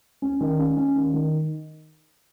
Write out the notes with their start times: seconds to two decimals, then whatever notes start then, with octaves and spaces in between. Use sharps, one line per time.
0.22 C#4
0.41 D#3
0.59 C#4
0.77 C#4
0.96 D#3
1.14 D#3